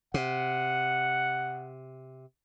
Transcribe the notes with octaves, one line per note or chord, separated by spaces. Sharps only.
C3 F#5